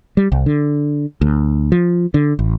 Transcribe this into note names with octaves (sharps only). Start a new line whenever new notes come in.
G3
C2
D3
D2
F3
D3
A1